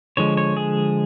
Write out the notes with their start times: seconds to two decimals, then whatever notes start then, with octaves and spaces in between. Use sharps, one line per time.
0.17 D3 F3 G#3 C#5
0.37 C#5
0.57 G#4